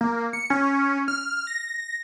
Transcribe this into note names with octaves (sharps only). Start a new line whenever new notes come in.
A#3
C#7
C#4
F6
A#6